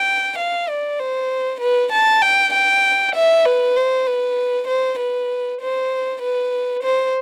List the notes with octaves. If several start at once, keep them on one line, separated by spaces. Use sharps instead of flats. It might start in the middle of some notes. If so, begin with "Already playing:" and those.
Already playing: G5
F5
D5
C5
B4
A5
G5
G5
E5
B4
C5
B4
C5
B4
C5
B4
C5